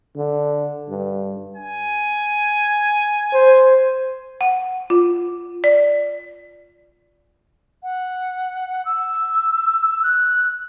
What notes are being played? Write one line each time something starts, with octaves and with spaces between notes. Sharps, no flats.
D3
G2
G#5
C5
F#5
F4
D5
F#5
E6
F#6